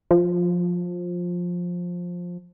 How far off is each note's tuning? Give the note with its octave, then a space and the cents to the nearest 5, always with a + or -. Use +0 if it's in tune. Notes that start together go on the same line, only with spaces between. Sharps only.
F3 +15